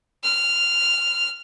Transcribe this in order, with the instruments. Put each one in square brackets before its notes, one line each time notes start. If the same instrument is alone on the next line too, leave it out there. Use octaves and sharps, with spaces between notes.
[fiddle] F6